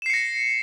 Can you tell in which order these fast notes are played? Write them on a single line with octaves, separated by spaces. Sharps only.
E7 C7 C#7 A#6